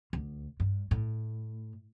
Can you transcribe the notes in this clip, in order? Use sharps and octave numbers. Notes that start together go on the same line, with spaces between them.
D2
G2
A2